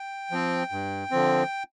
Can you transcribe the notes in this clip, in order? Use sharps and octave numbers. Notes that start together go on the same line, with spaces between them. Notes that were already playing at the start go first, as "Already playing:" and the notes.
Already playing: G5
F3 C4
G2
D3 F3 C4